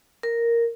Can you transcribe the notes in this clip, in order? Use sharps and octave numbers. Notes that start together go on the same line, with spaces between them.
A#4